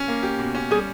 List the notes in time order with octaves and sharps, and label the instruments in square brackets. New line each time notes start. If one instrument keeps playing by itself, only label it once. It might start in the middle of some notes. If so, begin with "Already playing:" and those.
Already playing: [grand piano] C#4
A#3
G4
B2
C#4
[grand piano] G3 [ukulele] G#4